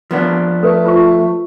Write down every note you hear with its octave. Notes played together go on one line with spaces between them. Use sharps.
F3 B3 D4
A3 A4 B4
F4 C5 C#6